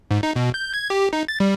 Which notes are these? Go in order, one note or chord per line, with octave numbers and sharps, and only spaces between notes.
G#2
D#4
B2
G6
G#6
G4
D#4
A6
G3